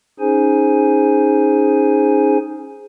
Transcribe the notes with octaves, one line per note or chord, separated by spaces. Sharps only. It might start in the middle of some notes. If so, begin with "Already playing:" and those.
C#4 D#4 G#4 C5 G#5